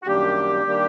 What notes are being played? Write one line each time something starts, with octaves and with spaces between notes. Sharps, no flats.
F#4
F#2 D#3 G3 A#3 D4 G4
D#3 G3 A#3 D4